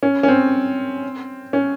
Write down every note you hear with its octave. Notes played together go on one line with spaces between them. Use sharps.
C#4
C#4
C4
C#4